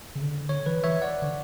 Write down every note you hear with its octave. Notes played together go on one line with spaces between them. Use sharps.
C#3
D3
D3 C#5
E3 B4
E3 C#5 E5
D5 F#5
D3